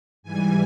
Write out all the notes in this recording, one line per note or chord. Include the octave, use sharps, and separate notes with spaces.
G#2 E3 G3 G#5